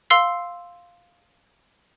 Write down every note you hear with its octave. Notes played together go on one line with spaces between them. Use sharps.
F5 C6 E6 C7